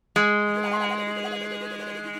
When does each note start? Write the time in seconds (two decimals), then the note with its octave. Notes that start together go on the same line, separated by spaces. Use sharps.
0.16 G#3